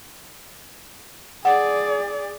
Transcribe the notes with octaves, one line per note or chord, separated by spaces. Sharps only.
G#4 D5 F#5